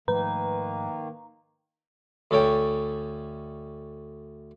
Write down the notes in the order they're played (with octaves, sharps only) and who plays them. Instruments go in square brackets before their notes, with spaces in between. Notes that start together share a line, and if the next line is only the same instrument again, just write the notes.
[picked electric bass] G#2 F3 A3 [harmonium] D#3 A#3 [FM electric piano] B4 [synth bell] A#5
[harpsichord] D2 C#4 A4 C#5 G5